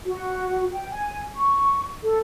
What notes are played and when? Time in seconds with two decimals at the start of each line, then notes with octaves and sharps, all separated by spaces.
0.06 F#4
0.72 G5
0.91 G#5
1.36 C#6
2.04 A4